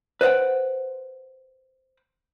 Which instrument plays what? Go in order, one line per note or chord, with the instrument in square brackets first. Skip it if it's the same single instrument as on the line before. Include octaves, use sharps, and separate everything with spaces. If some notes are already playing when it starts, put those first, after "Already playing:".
[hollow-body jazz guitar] B4 C5 D#5 F#5 G5